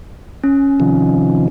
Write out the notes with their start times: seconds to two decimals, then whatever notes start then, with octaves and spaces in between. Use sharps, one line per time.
0.44 C#4
0.80 C3 D#3 F3